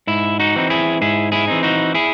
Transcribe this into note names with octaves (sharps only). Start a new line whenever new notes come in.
G#2 E4
D#4 F#4
E3 C4 D#4
E4 G#4
G#2 E4 G#4
E4 G#4
E3 C4 D#4
D#4 F#4
E4 G#4